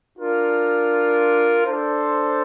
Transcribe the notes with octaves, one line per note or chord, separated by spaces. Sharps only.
D4 F4 A#4
D4 A4 C5